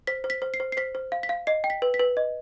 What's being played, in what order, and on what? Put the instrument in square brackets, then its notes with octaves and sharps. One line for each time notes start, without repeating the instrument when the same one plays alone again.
[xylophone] C5 B6
C5
B6
C5
C7
C5
C7
C5 B6
C5
F5
B6
F5
D#5 C7
G5
B6
B4
B6
B4
D#5